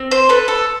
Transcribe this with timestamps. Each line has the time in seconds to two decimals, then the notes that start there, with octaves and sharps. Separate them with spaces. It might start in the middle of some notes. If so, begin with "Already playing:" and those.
Already playing: C4
0.11 C5
0.29 A4 B4
0.48 A4